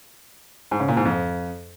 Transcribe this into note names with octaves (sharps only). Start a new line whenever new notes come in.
G#2
C#3
A#2
G#2
F2